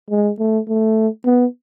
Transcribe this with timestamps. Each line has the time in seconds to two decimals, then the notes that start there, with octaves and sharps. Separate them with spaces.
0.10 G#3
0.39 A3
0.68 A3
1.26 B3